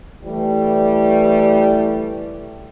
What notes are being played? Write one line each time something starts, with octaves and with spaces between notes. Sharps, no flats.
E3 G3 A3